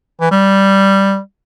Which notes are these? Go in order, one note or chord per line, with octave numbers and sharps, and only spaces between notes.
E3
G3